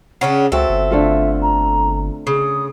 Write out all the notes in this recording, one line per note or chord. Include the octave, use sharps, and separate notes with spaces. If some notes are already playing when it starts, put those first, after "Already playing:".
C#3 C#4 D4 F#5
C#2 C4 F#4 A4 E5
G1
D3 A3 F4
A#5
C#3 D#6